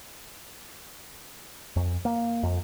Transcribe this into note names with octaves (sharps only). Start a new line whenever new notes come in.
F2
A#3
F2